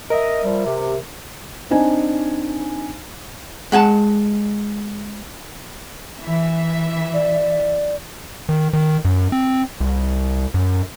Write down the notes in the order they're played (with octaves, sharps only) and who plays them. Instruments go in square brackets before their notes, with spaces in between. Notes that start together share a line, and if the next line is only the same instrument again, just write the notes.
[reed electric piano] A#4 E5 [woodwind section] D#5
[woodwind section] F3 G3
C3
[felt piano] C4 D4 D#4 G#5
[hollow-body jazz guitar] G#3 F#5 G#5 A5
[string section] E3 E5
[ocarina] D5
[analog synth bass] D#3
D#3
F#2
C4
C2
F#2